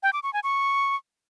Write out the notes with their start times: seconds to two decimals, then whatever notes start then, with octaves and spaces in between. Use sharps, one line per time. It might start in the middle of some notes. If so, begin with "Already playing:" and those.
0.03 G5
0.13 D6
0.23 C#6
0.33 G#5
0.44 C#6